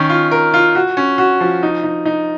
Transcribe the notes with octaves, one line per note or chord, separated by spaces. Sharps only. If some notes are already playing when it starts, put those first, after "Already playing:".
Already playing: D#3 C#4
F4
A#4
F4
F#4
C#4
F#4
F3
D#4
D#4
D#4